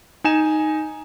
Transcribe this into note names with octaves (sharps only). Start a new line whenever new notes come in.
D#4 G#5 E7